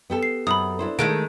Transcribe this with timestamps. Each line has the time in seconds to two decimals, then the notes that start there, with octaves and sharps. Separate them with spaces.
0.10 B3 G4 A4
0.23 C7
0.47 F#2 B5 D#6
0.79 D4 E4 C5
0.99 D#3 G#3 A3 D7